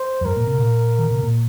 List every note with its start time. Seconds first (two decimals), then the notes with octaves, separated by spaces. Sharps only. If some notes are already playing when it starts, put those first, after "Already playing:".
Already playing: C5
0.21 F2
0.25 G2 A#4
0.36 A#2
0.47 C3
0.58 A#2
0.99 D#3
1.11 C3
1.23 A#2